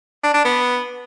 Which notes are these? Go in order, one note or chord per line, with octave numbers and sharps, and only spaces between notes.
D4
D4
B3